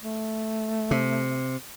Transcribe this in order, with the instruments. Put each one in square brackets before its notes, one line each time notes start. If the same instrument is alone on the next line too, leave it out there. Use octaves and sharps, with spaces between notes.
[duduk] A3
[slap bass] C3